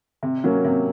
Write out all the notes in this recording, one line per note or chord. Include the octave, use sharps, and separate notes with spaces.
C3
F#3 A#3 C#4
C3